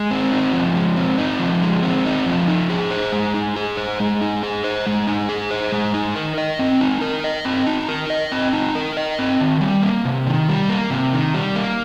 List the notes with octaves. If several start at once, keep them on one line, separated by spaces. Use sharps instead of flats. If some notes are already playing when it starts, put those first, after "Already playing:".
Already playing: G#3
C4
D#4
F3
G#3
C4
D#4
F3
G#3
C4
D#4
F3
D#4
G#4
C5
G#3
D#4
G#4
C5
G#3
D#4
G#4
C5
G#3
D#4
G#4
C5
G#3
D#4
A#4
D#5
C4
D#4
A#4
D#5
C4
D#4
A#4
D#5
C4
D#4
A#4
D#5
C4
D#3
G3
A#3
C3
D#3
G3
A#3
C3
D#3
G3
A#3